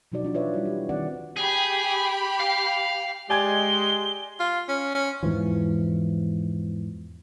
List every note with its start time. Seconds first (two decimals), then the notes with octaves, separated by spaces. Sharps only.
0.12 B2 F3 F#3 D#4 F#4 D5
0.23 E3 D4 F4
0.34 F4 B4 C#5 D5 E5
0.54 G3 E4 F#4
0.65 G4
0.89 D#3 C4 D5 F#5
1.37 G4 G#4 B5
2.40 F5
3.30 G#3 G4 D5 G#5 G#6 G7
4.39 F4
4.69 C#4
4.95 C#4
5.23 E2 G#2 E3 F3